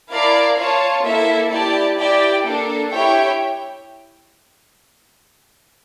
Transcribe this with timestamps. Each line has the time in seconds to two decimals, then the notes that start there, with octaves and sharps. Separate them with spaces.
0.11 E4 A#4 D5 F5 A5
0.57 F4 C#5 F5 A5
1.04 A#3 E4 A4 E5
1.51 E4 G4 D5 A5
1.97 E4 G4 D5 G5
2.43 A#3 D4 A4
2.90 E4 G4 C#5 E5 G5